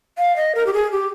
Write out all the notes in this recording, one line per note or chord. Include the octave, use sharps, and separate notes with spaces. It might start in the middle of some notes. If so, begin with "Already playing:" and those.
F5
D#5
A#4
G4
G#4
G4